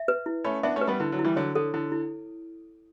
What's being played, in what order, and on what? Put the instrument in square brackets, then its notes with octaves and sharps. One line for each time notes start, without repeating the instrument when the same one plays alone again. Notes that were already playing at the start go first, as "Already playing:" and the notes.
Already playing: [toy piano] E5
B4
E4
[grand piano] A3 C#4 [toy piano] B5
[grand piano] B3 D4 [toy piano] E5
[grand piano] A3 C#4
[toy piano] B4
[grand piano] G3 B3
[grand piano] D3 [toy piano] E4
[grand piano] D3 F#3
[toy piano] E4
[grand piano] E3 G3
[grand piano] D3 F#3 [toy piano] C#5
[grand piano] D3 [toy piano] A4
[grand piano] D3 [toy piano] E4
[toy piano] E4